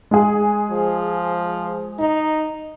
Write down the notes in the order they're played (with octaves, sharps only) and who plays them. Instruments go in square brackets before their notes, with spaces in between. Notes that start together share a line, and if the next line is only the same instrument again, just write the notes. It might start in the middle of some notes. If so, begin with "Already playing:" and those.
[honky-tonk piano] G#3 G#4
[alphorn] F3
D#4